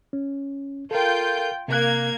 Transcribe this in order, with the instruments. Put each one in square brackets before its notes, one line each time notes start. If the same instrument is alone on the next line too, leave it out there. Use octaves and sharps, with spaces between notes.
[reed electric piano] C#4
[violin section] F4 G5 G6 [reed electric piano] A4 A#4
[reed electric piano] C3 F#6 [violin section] A#3 G#6